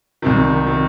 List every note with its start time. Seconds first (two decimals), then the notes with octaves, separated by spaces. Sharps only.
0.22 C2 C3 D#3
0.66 C3 D#3